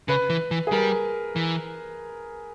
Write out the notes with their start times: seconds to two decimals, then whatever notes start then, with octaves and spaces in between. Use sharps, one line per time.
0.08 C#3 B4
0.30 E3
0.51 E3
0.67 G#4
0.72 G3 A#4
1.36 E3